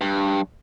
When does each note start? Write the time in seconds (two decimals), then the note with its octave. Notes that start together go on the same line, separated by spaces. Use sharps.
0.01 G2